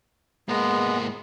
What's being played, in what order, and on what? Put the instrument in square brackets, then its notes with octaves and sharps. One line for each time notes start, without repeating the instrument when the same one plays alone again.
[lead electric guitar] G#2 A#3 [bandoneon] G#3 B3